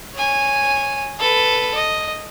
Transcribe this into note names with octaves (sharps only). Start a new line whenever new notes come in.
C#5 G#5
A4 B4
D#5